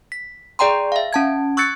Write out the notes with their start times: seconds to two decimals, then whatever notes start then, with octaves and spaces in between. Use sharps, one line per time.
0.12 B6
0.59 G#4 D5 G5 A#5 C6
0.92 E5 F5
1.13 C#4 A5 G#6
1.57 C#6 E6 F#6 G#6 A6 C#7